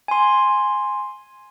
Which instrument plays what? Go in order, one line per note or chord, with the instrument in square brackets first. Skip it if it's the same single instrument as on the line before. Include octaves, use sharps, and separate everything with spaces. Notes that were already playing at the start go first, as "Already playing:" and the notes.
[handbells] G#5 C6